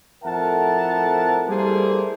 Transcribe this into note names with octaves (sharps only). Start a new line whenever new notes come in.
F2 A2 A#4 E5 F#5 A5
G3 A3 A#3 E4 G#4 C5